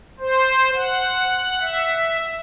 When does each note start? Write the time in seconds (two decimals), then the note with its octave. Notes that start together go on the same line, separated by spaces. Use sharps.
0.20 C5
0.74 F#5
1.62 E5